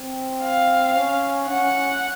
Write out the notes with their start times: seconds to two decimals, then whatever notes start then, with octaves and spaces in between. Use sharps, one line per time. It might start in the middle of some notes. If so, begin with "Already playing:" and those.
Already playing: C4
0.43 F5
0.96 C#4
1.49 C#4 F#5